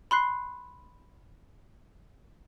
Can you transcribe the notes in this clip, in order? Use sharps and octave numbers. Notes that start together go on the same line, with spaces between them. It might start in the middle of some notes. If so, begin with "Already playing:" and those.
B5 C6 F#6 C7